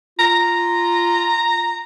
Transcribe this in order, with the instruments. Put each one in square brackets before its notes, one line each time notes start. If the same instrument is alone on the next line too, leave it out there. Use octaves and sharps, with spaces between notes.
[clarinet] F4 [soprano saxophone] A#5